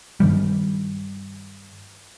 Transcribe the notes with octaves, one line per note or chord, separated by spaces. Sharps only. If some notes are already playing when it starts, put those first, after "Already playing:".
G2 D#3 G3